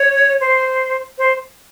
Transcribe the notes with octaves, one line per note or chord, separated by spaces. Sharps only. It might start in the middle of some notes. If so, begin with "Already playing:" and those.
Already playing: C#5
C5
C5